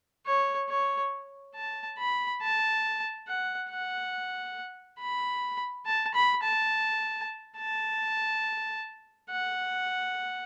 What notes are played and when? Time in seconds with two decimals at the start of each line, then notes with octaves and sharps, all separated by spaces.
0.26 C#5
0.69 C#5
1.55 A5
1.99 B5
2.42 A5
3.27 F#5
3.70 F#5
4.99 B5
5.86 A5
6.14 B5
6.43 A5
7.58 A5
9.30 F#5